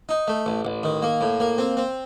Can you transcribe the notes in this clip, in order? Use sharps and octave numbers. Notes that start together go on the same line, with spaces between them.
D#4
A3
A1
A1
D#3
A#3
A2
A#3
C4
C4